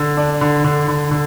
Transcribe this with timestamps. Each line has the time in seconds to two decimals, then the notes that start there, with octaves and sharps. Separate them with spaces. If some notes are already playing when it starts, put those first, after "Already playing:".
Already playing: D3
0.17 D4
0.41 D3
0.64 D3
0.88 D3
1.11 D3